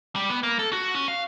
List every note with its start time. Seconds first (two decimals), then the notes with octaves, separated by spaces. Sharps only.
0.16 G3
0.30 B3
0.43 A#3
0.59 A4
0.73 F#4
0.95 C#4
1.08 F5